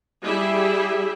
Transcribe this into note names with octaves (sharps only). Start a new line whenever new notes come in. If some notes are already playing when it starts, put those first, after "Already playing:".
G3 E4 G4 G#4 E5